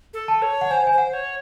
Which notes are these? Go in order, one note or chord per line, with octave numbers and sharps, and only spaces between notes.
A4
A5
C#5
F#5
C5 G#5
G#5
C5
F#5
C#5